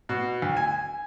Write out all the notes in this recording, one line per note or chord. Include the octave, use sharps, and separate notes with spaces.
B2
D2
G#5